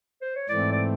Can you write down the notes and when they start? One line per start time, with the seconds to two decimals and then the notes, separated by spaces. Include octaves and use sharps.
0.22 C5
0.35 C#5
0.49 G#2 E3 A3 C4 D5
0.72 D5